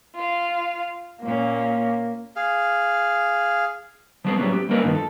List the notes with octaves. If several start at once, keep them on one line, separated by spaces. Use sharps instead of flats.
F4 F5
A#2 A#3 C#4
G#4 F5
F3 G3 B3 C4 F#4 G#4
A2 F#3 G3 A3 B3 C#4
G4
G3 A#3 C#4 A#4 B4 D#5
G2 D#3 F3
A4